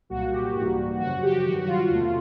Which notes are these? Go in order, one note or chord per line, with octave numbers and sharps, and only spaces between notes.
C2 A#2 F#3 A#3 F#4
G4
G#2 E3 G3 A#3 F#4
F#4
F#2 C#3 F3 F#4
G4
G2 D#3 F#3 F#4
F#4
F4
E2 C3 F3 A3 F4